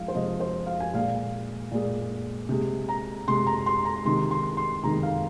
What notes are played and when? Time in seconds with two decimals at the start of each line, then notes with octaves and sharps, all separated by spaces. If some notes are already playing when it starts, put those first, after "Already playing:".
Already playing: F3 G#3 F5
0.08 C5
0.14 C3 F3 G#3 D#5
0.40 C5
0.67 F5
0.80 G#5
0.93 A#2 G#3 F5
1.71 A#2 G#3
2.49 C3 G#3
2.89 A#5
3.28 C3 G#3 C6
3.47 A#5
3.66 C6
3.85 A#5
4.05 C3 D#3 G#3 C6
4.31 C6
4.57 C6
4.83 C3 D#3 G#3 A#5
5.03 F5